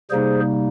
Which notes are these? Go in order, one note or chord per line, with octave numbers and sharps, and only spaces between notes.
C3 G3 A#3 D#4 G#4 C5